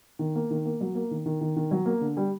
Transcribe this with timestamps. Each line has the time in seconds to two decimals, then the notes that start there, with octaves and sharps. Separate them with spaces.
0.19 D#3
0.35 A#3
0.51 D#3
0.65 A#3
0.81 F#3
0.95 A#3
1.11 D#3
1.26 D#3
1.41 D#3
1.56 D#3
1.71 F#3
1.86 A#3
2.01 D3
2.17 G3